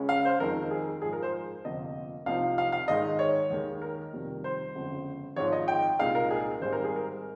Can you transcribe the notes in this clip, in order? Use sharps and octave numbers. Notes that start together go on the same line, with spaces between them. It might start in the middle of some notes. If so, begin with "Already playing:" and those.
Already playing: C#2 C#3 G#3 C#4
F5
C5
F2 D#3 G#3 D#4 A#4
G#4
G#2 F3 G#3 G#4
A#4
C5
G1 F2 C3 F3 A#3 D#5
C2 C3 F3 C4 D#4 F5
F5
F5
G#2 D#3 G#3 D#4 D#5
C#5
D#2 D#3 G#3
A#4
F2 C3 D#3 G3
C5
G1 F2 C#3 G#3
G#1 G#2 F3 C#5
D#5
G5
C2 A#2 G#3 D#4 F5
A#4
G#4
G#1 G#2 G3 C4 C5
A#4
G#4
A#4